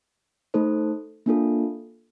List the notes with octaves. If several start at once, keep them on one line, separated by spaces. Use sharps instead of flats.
A3 D#4 A4 C5
A#3 D4 F4 A4